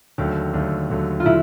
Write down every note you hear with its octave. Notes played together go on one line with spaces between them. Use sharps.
D#2 D3 F#3 A3 G4
D#2 D3 F#3 A3
D#2 D3 F#3 A3
F4
D3 F#3 E4